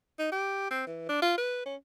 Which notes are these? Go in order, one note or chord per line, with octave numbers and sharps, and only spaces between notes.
D#4
G4
C4
E3
D4
F4
B4
C#4